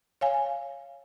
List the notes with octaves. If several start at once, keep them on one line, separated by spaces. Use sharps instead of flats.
C#5 F5 G#5